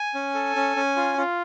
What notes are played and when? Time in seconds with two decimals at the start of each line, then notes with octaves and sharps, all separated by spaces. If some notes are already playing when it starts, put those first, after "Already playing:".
Already playing: G#5
0.15 C#4
0.35 A4
0.56 C#4
0.76 C#4
0.96 F4
1.18 F4